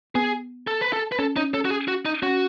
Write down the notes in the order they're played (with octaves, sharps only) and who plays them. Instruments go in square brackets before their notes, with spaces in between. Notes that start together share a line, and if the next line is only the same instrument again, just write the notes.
[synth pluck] B3 [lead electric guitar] G#4
[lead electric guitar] A4
B4
A4
B4
[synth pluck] C#4 [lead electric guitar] A4
[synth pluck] C#4 [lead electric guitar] D#4
[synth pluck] C#4 [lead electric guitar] A4
[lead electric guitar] F#4
G#4
F#4
D#4
[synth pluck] C#4 [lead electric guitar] F#4